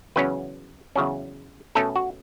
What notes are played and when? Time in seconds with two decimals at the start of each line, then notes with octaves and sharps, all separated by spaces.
0.16 E2 C#3 F#3 C#4 B4
0.96 E2 C#3 F#3 C#4
1.75 B2 A3 C#4 A4
1.96 F#4